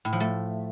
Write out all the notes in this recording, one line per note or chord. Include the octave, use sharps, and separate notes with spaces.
A2
F3
A3